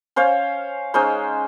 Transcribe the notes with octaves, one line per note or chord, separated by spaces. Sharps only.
C#4 C5 C#5 F5
G#3 C#4 D#4 C5